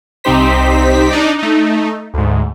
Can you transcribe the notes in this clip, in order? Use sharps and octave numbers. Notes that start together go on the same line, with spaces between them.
C2 C4 D#4 G4 C5 B6
D4 D#4 D5
A3 D#4
D2 G#2